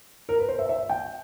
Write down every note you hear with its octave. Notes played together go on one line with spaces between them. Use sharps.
A#4
B4
C5
E5
E5
G5